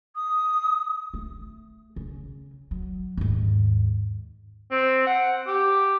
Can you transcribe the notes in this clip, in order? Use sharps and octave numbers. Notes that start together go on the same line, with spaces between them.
D#6
A3
C#3
F#3
D#2 G#2
C4
F#5
G4